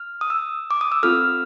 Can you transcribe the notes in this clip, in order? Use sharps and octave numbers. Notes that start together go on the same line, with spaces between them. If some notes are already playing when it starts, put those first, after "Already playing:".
Already playing: F6
D#6
E6
D6
D#6
E6
C4 F4 A4 F6